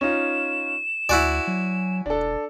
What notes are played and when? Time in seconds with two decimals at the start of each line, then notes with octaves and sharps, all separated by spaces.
0.01 C#4 D#4 F4 E7
1.09 D2 E4 F#4 D5 G#5
1.47 F#3
2.06 E1 D4 A4